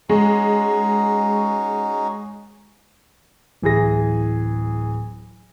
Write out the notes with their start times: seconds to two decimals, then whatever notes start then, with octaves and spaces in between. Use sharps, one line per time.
0.09 G#3 C#4 D#4 F#4
3.62 D1 E3 E4 G#4 A#6